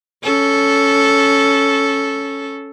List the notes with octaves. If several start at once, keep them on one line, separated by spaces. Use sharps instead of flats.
C#4 A4